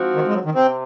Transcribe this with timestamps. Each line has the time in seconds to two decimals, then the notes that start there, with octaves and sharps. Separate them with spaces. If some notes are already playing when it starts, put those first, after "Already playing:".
Already playing: G#2 F3 C4 F#4
0.15 D#3
0.28 G#3
0.35 F#3
0.45 D#3
0.54 C3 C4